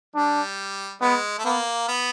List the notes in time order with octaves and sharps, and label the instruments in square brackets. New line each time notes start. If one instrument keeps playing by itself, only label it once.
[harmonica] G3 [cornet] D4
[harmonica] G#3 [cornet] B3
[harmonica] A3
[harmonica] A#3 [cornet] B3
[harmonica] B3